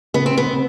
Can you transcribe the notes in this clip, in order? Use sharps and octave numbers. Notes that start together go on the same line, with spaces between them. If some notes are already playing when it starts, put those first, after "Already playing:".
C#3 B3
C4
B3
C4